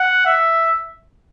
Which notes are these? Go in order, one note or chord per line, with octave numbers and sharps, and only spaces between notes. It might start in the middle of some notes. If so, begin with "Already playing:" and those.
Already playing: F#5
E5